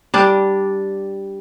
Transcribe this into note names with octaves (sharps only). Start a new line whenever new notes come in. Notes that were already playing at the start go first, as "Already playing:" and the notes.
G3 D4